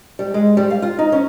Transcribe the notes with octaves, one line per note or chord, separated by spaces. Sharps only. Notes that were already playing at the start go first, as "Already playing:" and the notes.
G3
G#3
G3
F5
F4
D#4
C#4